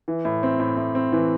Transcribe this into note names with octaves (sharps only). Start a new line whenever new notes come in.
E3
A2
C4
A2
A2
C4
E3